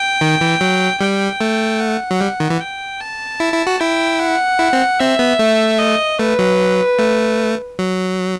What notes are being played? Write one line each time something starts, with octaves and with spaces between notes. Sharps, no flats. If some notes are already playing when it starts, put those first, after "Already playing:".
Already playing: G5
D#3
E3
F#3
G3 G5
A3
F#5
F#3
G3
D#3
E3
G5
A5
E4
E4
F#4
E4 G5
F#5
E4
C4
C4 E5
B3
A3
D#5
A3 B4
F#3
A3
F#3